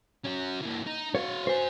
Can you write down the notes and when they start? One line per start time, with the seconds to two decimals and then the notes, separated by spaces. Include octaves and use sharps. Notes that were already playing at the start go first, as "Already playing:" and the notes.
0.25 C#4 F#4
0.62 E3 A#3
0.87 D#4
1.15 F#4 C#5 F5
1.47 F#4 C5 G#5